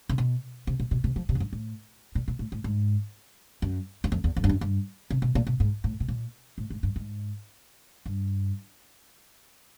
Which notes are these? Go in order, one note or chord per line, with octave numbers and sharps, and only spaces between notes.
C3
B2
C3
A#2
B2
C3
F3
C3
F#2
G2
A2
A#2
A#2
A2
A2
G#2
F#2
F#2
F2
E2
F2
G2
F#2
G2
C3
B2
A#2
B2
G#2
A2
B2
A#2
A2
G#2
G2
G#2
G2